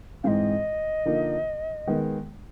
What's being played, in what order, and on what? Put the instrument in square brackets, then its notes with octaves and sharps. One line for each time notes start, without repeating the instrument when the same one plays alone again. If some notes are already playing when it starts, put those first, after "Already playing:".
[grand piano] G#2 E3 G#3 C4 [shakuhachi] D#5 F5
[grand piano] D3 F3 A#3 D#4
D#3 G#3 B3